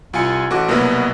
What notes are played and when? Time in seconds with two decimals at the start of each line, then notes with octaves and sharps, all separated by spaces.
0.13 C2 F4 G#5 C#7
0.50 A1 F#4 A4 D6 F#6
0.68 C2 B2 F#3 A#3 B3